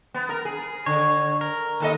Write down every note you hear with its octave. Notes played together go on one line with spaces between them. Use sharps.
B3
A#4
G#4
D3 C#5
A#4
D#2 A4 D#5